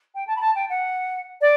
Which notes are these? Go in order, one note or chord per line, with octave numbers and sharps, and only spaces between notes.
G5
A5
B5
A5
G5
F#5
D5